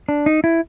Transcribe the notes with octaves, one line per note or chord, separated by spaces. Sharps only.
D4
D#4
E4